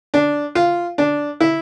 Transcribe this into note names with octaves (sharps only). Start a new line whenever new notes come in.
D4
F4
D4
E4